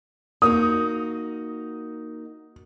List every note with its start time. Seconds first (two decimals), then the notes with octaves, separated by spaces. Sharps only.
0.42 A#3 D#4 F#4 D#6